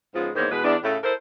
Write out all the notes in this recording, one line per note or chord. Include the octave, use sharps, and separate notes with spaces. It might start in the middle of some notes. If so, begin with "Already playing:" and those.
G#2 F3 G#3 B3 C#4 F4
E2 G#2 D#3 A#3 C5 C#5
B2 E3 G#3 B4
E2 D4
A2 C#3 A3
E4 A4 A#4 C5